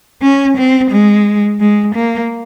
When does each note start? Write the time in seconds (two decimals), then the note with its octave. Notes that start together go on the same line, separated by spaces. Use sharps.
0.22 C#4
0.57 C4
0.91 G#3
1.60 G#3
1.95 A#3